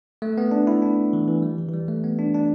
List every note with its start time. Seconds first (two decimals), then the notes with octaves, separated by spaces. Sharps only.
0.22 A3
0.38 B3
0.51 D4
0.67 E4
0.82 D4
1.13 E3
1.28 E3
1.42 G3
1.58 E3
1.69 E3
1.73 G3
1.88 A3
2.04 B3
2.19 D4
2.34 D4